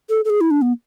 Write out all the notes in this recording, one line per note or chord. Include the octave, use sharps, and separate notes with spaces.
A4
A4
G#4
E4
D4
B3